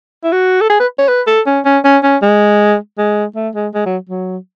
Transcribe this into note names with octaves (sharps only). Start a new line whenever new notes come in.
E4
F#4
A4
G#4
B4
C#5
B4
A4
C#4
C#4
C#4
C#4
G#3
G#3
A3
G#3
G#3
F#3
F#3